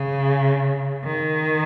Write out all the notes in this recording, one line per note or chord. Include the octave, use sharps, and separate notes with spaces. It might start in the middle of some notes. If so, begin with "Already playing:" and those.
Already playing: C#3
D#3